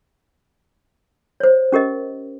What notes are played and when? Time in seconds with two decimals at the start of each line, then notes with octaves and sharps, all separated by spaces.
1.40 C5 C#5
1.72 C#4 G4 A#4 D#5